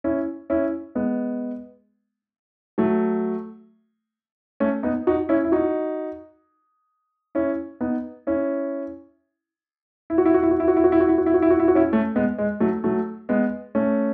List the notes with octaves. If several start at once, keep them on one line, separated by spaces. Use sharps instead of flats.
C#4 E4
C#4 E4
G#3 B3
F#3 A3
A3 C#4
B3 D#4
D#4 F#4
C#4 E4
E4
D#4 F#4
C#4 E4
B3 D#4
C#4 E4
E4
F#4
E4
F#4
E4
F#4
E4
F#4
E4
F#4
E4
F#4
E4
F#4
E4
F#4
E4
F#4
E4
F#4
C#4 E4
A3 C#4
G#3 B3
G#3
F#3 A3
F#3 A3
G#3 B3
A3 C#4